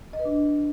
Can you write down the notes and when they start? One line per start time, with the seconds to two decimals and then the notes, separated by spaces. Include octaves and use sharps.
0.13 D#5
0.19 B4
0.25 D4